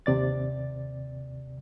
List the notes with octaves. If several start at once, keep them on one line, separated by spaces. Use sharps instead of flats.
D#2 C3 D5 A6